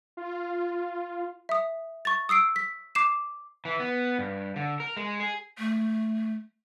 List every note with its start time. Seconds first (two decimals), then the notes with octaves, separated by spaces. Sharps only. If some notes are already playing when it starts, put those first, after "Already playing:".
0.17 F4
1.49 E5 D#6
2.05 C#6 A6
2.29 D#6 E6 C7 D7
2.56 B6
2.95 D6 C7 E7
3.65 E3
3.80 B3
4.19 G2
4.56 D3
4.80 A#4
4.97 G#3
5.20 G#4
5.59 A3